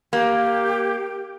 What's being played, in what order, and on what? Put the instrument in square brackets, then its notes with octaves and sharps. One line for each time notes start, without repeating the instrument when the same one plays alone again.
[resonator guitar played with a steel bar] A#3 [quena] G4